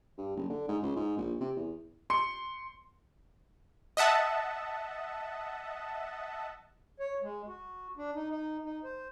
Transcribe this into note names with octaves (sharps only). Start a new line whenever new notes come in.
G2
F#1
D3
G#2
C#2
G#2
A#1
C3
E2
C6 C#7
D#5 E5 F#5 A5
C#5
G#3
F#4
D4
D#4
D#4
D#4
C5